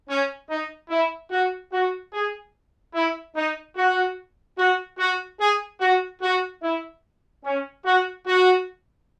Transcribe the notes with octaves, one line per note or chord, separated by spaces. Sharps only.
C#4
D#4
E4
F#4
F#4
G#4
E4
D#4
F#4
F#4
F#4
G#4
F#4
F#4
E4
C#4
F#4
F#4